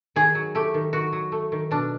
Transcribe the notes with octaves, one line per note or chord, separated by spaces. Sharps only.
D#3 G#4
F#3
A3 G4
D#3
D#3 F#4
F#3
A3
D#3
B2 D4